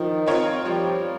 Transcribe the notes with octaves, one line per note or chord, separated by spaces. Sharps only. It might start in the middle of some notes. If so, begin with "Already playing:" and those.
Already playing: D#3 F3
C4 F4 A#4 C#5
F3 G3